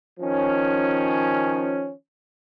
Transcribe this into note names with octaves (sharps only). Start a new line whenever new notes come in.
D#3 F3 C#4